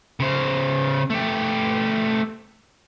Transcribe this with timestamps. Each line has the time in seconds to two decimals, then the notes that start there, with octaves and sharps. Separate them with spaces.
0.20 C#3 C5
1.10 A3 G4